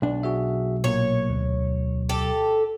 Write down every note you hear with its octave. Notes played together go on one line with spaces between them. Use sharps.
B1 D4
F#4 G#4 E5
A#2 A#3 C#5
D2
G4 A4